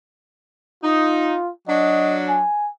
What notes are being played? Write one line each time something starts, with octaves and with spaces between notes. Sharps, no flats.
D#4 F4
F#3 D4 D#5
G#5